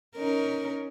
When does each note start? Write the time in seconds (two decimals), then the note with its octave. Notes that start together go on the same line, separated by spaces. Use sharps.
0.16 C#4 D#4 A#4